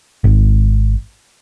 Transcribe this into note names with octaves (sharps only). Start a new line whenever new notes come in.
G#1